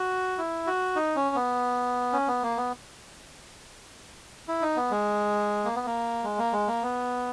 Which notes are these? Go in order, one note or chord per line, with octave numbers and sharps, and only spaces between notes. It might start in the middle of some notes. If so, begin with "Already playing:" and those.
Already playing: F#4
E4
F#4
D#4
C#4
B3
C#4
B3
A#3
B3
E4
D#4
B3
G#3
A#3
B3
A#3
G#3
A#3
G#3
A#3
B3